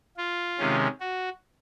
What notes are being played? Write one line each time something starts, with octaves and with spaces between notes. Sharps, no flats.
F4
C3 D#3 G#3 C#4
F#4